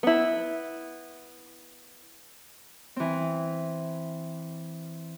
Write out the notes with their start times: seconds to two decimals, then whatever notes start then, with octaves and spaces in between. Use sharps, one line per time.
0.03 B3 E4
2.96 E3 C4